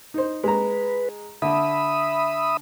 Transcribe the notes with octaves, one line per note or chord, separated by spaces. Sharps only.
D#4 C5
G#3 B4 A#5
D3 E5 B5 D#6